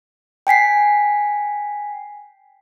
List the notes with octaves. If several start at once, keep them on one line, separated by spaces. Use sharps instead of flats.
G5 G#5 B6 C7